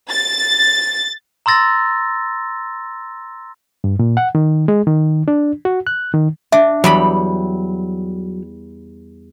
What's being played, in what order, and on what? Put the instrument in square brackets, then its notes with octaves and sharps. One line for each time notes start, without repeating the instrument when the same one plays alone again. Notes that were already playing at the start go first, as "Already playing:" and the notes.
[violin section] A6
[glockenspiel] A#5 C6 E6 A6 A#6
[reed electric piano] G2
A#2
F#5
D#3
G#3
D#3
D4
F#4
F#6
D#3
[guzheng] D4 [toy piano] E5
[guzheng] E2 G3 B5 [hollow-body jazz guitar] F#3